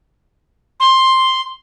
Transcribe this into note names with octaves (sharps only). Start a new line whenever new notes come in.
C6